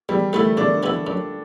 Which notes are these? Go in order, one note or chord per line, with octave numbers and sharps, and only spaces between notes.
E2 G3
C3 E3 A3 B3 E4
E2 D4
C3 E3 B3 E4
F#2